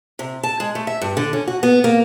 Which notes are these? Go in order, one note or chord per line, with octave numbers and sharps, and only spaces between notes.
C3
A5
G#3
A3
E5
G2
D3
C#4
F#4
B3
A#3